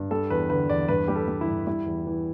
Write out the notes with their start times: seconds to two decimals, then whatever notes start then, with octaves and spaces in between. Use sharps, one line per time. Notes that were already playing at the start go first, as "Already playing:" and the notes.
Already playing: G2
0.11 G3 A4
0.30 E2 B4
0.50 D3 B4
0.69 E2 D5
0.88 G2 B4
1.08 G3 G4
1.16 A4
1.28 G3
1.41 E4
1.48 G2
1.67 G3 E4
1.86 E2
2.07 E3